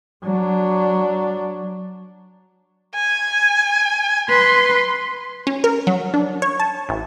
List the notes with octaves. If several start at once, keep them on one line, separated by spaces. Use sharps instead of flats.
F#3 D4
G#5
B4 C6
C#4
A#4
F#3
D4
C#5
A5
A1